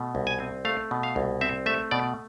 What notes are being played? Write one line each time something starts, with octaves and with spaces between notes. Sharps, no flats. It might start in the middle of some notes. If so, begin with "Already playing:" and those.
Already playing: B2 A3
C2
G#5
C4
A3 F5
B2
F5
C2
C4 E5
A3 E5
B2 D5